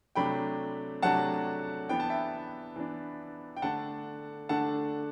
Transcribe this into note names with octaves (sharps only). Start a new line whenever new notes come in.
C3 F#3 A3 D4 G5 B5
C3 F#3 A3 D4 F#5 A5
E3 B3 D4 G5
A5
E5 G5
E3 B3 D4
G5
D3 A3 D4 F#5 A5
D3 A3 D4 F#5 A5